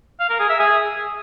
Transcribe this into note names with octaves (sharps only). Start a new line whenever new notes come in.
F5
A#4
G#4
E5
G#4